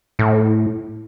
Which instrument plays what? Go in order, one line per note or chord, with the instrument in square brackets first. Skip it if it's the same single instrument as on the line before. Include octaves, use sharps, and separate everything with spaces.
[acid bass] A2